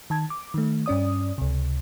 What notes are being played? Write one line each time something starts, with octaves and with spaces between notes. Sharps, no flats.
D#3 A5 G#6
D6
D#3 A3
G2 C#4 D5 D#6
C#2 C3